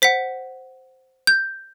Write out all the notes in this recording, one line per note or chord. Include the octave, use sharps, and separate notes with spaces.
C5 F#5 B6
G6